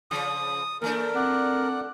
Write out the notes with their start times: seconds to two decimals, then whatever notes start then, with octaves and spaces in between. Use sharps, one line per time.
0.11 C#3 F3 D#6
0.82 E3 A3 A#3 D4 A#4
1.15 C4 D5 F#5